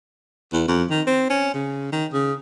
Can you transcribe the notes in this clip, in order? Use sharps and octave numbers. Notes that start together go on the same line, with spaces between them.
E2
F2
D#3
C4
C#4
C#3
D#3
C#3